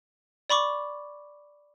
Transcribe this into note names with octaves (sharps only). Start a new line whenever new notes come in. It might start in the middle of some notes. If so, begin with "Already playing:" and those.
D5 B5 C#6 D6